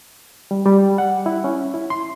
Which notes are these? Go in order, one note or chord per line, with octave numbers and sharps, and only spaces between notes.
G3
G3
F#5
E4
C#4
E4
C6